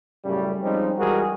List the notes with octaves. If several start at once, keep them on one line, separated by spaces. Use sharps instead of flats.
F#2 A2 C#3 G3
F3 G3 G#3 C4 C#4 D#4
E3 G3 G#3 F#4 G#4 A#4